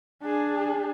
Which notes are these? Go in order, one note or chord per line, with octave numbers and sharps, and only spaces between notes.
D4 G#4